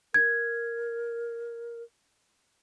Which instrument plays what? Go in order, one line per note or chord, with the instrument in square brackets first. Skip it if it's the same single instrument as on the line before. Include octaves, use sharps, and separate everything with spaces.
[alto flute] A#4 [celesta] G#6